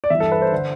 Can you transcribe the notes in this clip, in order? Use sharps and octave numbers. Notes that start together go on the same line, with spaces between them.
D5
G2 E3 E5
A4
B4
C5
D3